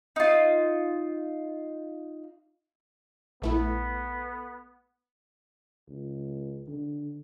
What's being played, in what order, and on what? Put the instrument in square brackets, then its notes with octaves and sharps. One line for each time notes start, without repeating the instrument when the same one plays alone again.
[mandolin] D#4 F4
[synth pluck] A#1 A3 E4 [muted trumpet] B3 [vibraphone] A4 B4
[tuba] C#2
D3